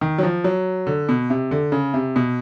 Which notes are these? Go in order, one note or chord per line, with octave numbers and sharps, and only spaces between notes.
D#3
F#3
F3
F#3
D3
B2
C3
D3
C#3
C3
B2